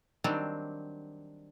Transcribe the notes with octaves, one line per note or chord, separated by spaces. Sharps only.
D#3 F#3 G3 C4 D4